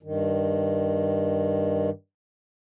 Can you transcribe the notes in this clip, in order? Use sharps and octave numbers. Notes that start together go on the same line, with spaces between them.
G2 D#3